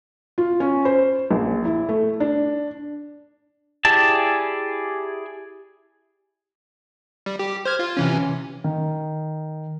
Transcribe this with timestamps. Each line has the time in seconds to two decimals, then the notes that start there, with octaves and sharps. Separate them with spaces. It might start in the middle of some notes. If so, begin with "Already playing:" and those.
0.38 F4
0.60 C#4
0.85 C5
1.31 A#1
1.65 E4
1.89 A3
2.20 D4
3.85 E4 G4 G#4 D5 A5
7.26 G3
7.39 G4
7.66 C5 F6 G#6
7.79 F4
7.97 C3 E3 C#4
8.64 D#3